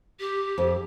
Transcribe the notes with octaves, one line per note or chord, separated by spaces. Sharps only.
G4
F2